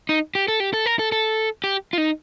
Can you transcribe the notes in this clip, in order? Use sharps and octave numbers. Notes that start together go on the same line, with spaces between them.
D#4
G4
A4
G4
A4
A#4
A4
A4
G4
F4
D#4